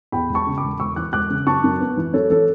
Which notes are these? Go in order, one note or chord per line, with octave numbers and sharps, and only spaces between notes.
E2 G5 B5
E1
A5 C#6
C#3
B5 D6
E1
E1 C#6 E6
E3 D6 F#6
E1 D6 F#6
C#3
F#2 A5 C#6
F#2
B3
E3
F#2 A4 C#5
E3 A4 C#5